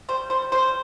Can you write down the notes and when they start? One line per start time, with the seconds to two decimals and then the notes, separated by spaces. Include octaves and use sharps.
0.09 G3 C5
0.30 G3 C5
0.52 G3 C5